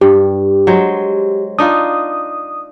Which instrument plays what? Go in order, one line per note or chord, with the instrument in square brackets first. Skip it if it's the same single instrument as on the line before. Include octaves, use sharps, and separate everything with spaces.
[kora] G2 [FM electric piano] G4
[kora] F#3 G#3 C5
[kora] D4 D#4 F4 [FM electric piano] D#6